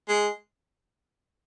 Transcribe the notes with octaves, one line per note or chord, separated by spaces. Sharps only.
G#3